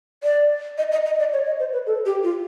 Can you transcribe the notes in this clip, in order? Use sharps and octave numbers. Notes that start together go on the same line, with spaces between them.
D5
D#5
D#5
D#5
D5
C#5
D#5
C5
B4
A4
G4
F4